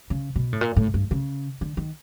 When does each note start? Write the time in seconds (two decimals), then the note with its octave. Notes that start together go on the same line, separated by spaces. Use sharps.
0.10 C#3
0.36 B2
0.53 A2
0.61 A#2
0.76 A2
0.94 G2
1.11 C#3
1.61 D3
1.77 D#3